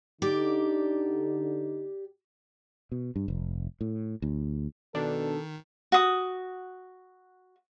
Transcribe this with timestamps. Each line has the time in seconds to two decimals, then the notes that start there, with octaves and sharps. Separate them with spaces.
0.22 D3 D#4 G4 D5
2.92 B2
3.16 G2
3.28 F1
3.81 A2
4.22 D2
4.95 B2 D#3 D4 A4
5.92 F#4 D#6